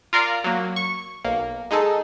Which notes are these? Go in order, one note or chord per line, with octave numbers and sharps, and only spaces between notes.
F4 A#4 D5 F5
F#3 A#3
C#6
B1 A#3
G#3 D#4 G#4 A4